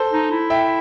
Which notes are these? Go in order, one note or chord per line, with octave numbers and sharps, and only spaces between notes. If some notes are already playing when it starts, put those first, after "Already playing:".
Already playing: A4 C5
D#4
E4
E5 G5